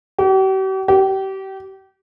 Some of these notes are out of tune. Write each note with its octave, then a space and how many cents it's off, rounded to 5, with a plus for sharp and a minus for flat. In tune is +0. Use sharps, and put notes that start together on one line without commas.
G4 -45
G4 -30